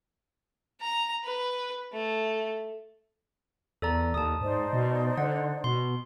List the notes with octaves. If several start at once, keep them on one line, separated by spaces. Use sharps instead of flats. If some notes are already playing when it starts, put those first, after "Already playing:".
A#5
B4
A3
E2 A4 D5 A#5
D#2 A5 D#6
G#2 D#4 C5 D5
B2
D3 F#5
B2 C6